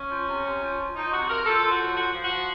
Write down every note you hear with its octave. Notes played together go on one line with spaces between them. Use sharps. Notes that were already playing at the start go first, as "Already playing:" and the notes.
Already playing: C#4
F3
C3
C3
F3
F3
F3 D#4
C3 F#4
C3 A#4
F3 A4
F3
F#4
A2
F3 F#4
F3
F#4
F3